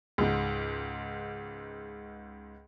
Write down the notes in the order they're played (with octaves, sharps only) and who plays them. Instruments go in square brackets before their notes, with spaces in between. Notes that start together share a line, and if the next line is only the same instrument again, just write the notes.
[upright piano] C#2 G#2